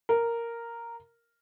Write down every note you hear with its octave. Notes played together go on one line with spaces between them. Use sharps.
A#4